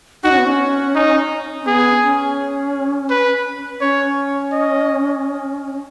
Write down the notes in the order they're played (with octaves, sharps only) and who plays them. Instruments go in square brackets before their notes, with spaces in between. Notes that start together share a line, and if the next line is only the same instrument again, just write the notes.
[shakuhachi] D#4 [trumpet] F#4
[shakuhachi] C#4
B3
C#4
[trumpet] D#4
[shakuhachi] C#4
[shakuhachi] B3 [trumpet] G#4
[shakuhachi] C#4
[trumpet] B4
[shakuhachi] C#4 [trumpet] C#5
[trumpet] D#5